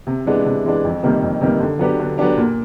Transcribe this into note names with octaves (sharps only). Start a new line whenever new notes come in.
C3
E3 G#3 B3 D4
C3
E3 G#3 B3 D4
F2
C3 D#3 G3 A#3
F2
C3 D#3 G3 A#3
D3
F#3 B3 D4 G4
D3
F#3 B3 D4 G4
A#2